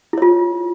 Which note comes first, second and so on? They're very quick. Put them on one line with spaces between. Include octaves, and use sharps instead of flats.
E4 C#5 F4